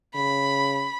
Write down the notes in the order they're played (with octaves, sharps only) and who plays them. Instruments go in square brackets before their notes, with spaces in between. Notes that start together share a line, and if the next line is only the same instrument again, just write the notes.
[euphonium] C#3 [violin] B5